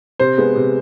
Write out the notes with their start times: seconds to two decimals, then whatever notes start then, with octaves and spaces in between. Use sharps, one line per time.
0.19 C3 C5
0.38 G#3 B3
0.56 C3